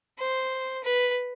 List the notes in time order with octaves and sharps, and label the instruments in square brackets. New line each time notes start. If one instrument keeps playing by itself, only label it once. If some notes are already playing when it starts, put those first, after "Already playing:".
[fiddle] C5
B4